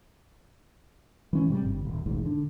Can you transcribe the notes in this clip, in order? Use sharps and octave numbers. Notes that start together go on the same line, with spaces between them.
E3 G#3 C#4
G#2 C3 G3
G1
D#1
E1 A1 G#2
D3